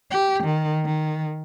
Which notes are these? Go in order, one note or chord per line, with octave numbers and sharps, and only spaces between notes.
G4
D#3
D#3